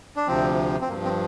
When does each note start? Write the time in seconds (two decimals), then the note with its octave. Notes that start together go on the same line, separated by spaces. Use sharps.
0.16 D4
0.28 D2 C3 F3 C4
0.81 C4
0.89 G2 F3 A#3
1.04 C4